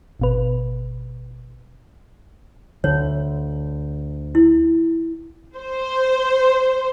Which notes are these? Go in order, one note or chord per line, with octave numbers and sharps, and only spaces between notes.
G#1 B2 B4
D2 D3 C#5
E4
C5